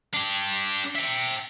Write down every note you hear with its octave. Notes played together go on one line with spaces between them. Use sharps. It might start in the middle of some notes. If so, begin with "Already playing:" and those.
D4 G4
E5 G5